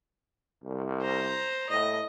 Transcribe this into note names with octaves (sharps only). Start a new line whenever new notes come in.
C2
C5 A#5
A2 D#5